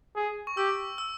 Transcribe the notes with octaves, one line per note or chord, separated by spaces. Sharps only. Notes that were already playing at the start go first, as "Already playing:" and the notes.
G#4
C#6
G4 E6
E6